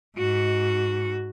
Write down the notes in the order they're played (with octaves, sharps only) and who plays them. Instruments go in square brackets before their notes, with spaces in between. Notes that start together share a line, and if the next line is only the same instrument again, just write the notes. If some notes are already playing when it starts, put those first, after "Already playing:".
[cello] G#2 F#4